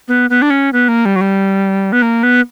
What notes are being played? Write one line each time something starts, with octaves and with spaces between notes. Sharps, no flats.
B3
B3
D4
C#4
B3
A#3
G3
F#3
G3
B3
A#3
B3